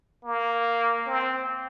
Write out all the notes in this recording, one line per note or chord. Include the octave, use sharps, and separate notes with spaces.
A#3
C4